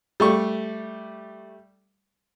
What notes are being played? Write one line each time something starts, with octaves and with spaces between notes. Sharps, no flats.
G3 A3 C#6